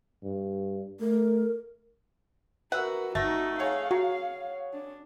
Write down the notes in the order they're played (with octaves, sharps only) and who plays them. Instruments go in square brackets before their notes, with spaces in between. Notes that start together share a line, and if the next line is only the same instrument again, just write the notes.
[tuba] G2
[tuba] A3 [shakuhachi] A#4
[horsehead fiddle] F#4 A#4 [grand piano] B4 E5 [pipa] F#5
[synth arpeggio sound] G1 [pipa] A3 [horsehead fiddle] D#4 F#4 [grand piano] A6 A#6
[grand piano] G#4 C#5 F#5 [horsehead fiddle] F5
[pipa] F#3 [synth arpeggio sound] F#4
[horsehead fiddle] D4